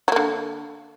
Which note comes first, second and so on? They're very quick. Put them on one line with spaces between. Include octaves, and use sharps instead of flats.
F#3 A#3 D3